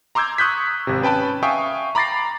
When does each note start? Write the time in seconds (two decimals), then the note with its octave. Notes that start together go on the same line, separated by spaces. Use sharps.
0.15 A#5 C6 D6 E6 G6 G#6
0.38 C#6 D#6 F#6 G6 B6
0.87 G#1 C3
1.02 C#4 B4 G5 A5 B5
1.43 E5 F5 G5 G#5 C#6 D#6
1.95 A#5 B5 D6 A6 A#6 C7